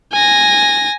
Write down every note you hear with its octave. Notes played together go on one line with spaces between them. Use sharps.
G#5 A#6